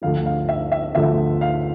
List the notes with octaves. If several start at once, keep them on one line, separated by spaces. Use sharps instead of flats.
D2 D3 F3 F5
F5
E5
E5
D2 D3 F3 E5
F5